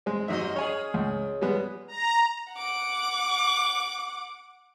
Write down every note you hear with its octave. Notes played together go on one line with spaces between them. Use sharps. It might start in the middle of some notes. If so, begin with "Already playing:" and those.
G#3 C4
G#2 F#3 G3 D#4 D#5 E5
C#4 G#4 C#5 G#5
C#2
G3 G#3 B3
A#5
F#5 D6